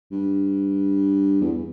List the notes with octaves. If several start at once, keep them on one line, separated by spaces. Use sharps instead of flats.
G2
E2